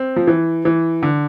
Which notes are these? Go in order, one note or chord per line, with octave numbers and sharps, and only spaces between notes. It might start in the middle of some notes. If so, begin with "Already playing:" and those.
Already playing: C4
F3
E3
E3
D3